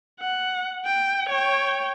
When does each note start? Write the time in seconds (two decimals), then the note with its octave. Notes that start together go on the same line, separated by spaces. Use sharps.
0.20 F#5
0.85 G5
1.29 C#5 G5